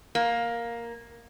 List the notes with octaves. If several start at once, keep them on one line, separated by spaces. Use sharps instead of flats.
A#3